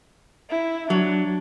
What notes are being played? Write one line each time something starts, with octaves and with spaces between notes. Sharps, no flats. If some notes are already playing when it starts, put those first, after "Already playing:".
E4
F#3 D4